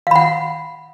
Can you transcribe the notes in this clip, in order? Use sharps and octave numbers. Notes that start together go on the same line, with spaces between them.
F5 F#5 B5